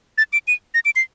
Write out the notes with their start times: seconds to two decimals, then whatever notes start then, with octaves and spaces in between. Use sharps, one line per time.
0.18 A6
0.33 D7
0.48 D#7
0.74 A#6
0.85 D7
0.96 C7